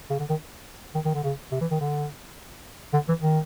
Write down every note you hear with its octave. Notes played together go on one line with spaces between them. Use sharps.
C#3
D3
D#3
D#3
D#3
D3
C#3
C3
E3
D#3
D3
D3
E3
D#3